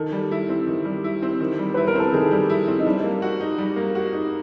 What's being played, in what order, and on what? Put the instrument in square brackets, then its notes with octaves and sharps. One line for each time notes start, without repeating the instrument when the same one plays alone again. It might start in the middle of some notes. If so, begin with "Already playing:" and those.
Already playing: [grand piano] D#3 [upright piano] A4
[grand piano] G3
E4
C4
D#3
G3
E4
C4
D#3
G3
[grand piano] E4 [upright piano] B4
[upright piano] A#4
[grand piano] C4 [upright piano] A4
[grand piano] D#3 [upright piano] G#4
[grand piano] G3
E4
C4
[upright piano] D#4
[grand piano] G3 [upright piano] D4
[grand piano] A#3
F#4
D#4
G3
A#3
F#4
D#4